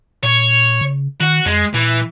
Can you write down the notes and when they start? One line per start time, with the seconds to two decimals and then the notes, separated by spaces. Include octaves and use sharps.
0.23 A#2 C#5
0.81 C#3
1.20 D#3 F#4
1.46 F2 G#3
1.74 A#2 E3